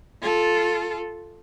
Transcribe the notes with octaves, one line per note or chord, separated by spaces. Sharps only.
F4 A4